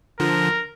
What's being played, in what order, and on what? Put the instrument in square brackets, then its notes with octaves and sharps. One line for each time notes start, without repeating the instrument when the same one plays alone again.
[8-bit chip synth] D3 F3 [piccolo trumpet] A#4